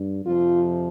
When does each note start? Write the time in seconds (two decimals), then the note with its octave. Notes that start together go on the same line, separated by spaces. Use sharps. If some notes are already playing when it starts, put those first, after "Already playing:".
Already playing: G2
0.25 F2 C3 F3 F4